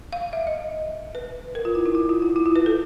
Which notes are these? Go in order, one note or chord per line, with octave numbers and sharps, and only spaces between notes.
F5
E5
D#5
B4
A#4
F4
E4
D#4
E4
F4
E4
E4
F4
B4
A4